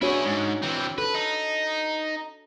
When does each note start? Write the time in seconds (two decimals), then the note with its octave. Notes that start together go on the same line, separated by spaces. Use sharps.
0.02 D4 E4 F#4 G#4 C#5
0.25 G#2
0.63 E3 C4
0.98 A4 B4
1.15 D#4